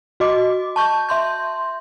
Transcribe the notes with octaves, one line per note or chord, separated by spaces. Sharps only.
F#4 D#5 D6
A5 C#6 G6
E5 C6 G6